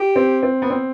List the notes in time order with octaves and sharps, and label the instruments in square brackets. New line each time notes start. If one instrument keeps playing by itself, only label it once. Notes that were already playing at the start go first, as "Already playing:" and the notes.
Already playing: [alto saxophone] G4
[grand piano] C4
C4
B3
C4